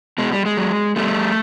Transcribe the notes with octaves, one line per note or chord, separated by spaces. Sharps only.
B2 G#3
G3
G#3
F#3
B2 G3 A3